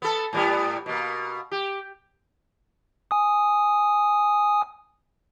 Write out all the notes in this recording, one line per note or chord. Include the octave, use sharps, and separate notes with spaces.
B3 A4
A2 G3 B3
B2 A#3
G4
G#5 D#6